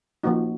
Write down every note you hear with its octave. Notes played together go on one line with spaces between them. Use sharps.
F3 A#3 C#4 D#4 F#4